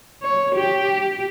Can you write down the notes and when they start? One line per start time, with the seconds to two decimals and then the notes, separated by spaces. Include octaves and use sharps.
0.22 C#5
0.55 G4